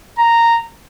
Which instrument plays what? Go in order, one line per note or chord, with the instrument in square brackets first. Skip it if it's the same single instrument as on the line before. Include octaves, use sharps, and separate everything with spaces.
[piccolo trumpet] A#5